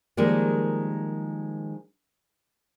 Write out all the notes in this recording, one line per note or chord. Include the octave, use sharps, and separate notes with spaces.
D#3 F3 G3 G#3 A#3